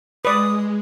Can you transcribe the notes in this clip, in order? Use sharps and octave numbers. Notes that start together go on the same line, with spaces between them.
G#3 B4 D5 D#6